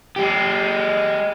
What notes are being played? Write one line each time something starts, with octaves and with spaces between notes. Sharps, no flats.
G#3 G4